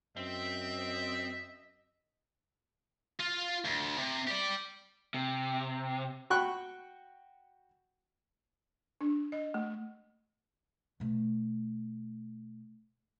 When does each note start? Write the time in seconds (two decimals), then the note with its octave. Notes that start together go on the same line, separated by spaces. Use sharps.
0.17 F#2 C4 D#5 E5
3.20 F4
3.65 D2
3.98 C3
4.27 G4 D5
5.14 C3
6.30 F#4 G5 B5 C#6 F#6
9.01 D4
9.32 D#5
9.54 A3
11.00 B2 A3